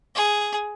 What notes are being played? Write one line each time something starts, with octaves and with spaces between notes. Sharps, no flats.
G#4